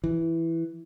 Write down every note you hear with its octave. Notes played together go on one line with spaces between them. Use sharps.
E3